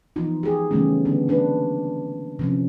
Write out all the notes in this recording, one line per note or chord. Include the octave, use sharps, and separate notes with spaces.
E3 F3 B3 D#4 F4
G4 G#4
C#3 E3 G3 A3 B3 C#4
D3 B3 D4
A#3 D4 B4
C3 F3 C#4